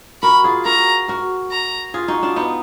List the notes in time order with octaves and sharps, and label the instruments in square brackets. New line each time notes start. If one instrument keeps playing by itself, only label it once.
[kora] F#4 A#4 [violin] B5
[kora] F4 G#4
[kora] F#4 A#4 [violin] A#5
[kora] F#4 A#4
[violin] A#5
[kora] F4 G#4
D#4 F#4
D4 F4
B3 D#4